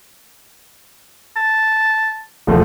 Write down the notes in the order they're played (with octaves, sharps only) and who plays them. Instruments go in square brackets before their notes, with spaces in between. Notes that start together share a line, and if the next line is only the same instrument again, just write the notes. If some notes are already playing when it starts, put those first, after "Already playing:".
[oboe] A5
[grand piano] E1 F3 A3